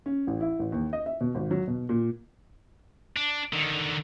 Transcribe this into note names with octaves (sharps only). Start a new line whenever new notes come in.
C#4
A1
E4
A1
D#2
D#5
E5
B2
G#1
F#3
B2
A#2
D4
D3 D#3